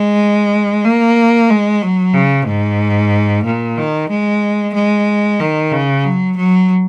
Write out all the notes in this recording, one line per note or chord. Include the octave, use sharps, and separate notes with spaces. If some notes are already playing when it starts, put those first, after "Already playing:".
Already playing: G#3
A#3
G#3
F#3
C#3
G#2
A#2
D#3
G#3
G#3
D#3
C#3
F#3
F#3